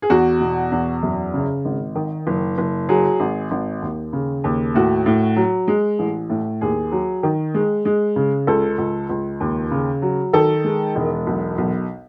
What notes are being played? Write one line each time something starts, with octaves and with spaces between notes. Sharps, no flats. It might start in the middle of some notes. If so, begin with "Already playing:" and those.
G#4
E2 F#4
B2
E2
F#2
C#3
G#1
D#3
F#1
F#1
F#3 G#4
G#1
G#1
D#2
C#3
D#2
A2 F#4
A2
F#3
G#3
A1
A2
D#2 G#4
F#3
D#3
G#3
G#3
C#3
C#2 A4
C#2
C#2
D#2
C#3
F#3
D#3 A4
G#3
E1
B1
B1